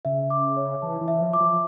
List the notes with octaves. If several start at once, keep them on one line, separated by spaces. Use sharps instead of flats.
C#3 E5
D6
C#5
E3 A5
E3
E5
F3
D6
F3